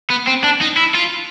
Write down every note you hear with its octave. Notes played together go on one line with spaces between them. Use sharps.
B3
C4
D4
D#4
E4
F4